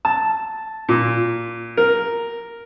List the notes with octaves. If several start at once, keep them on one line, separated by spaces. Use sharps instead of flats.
A5
A#2
A#4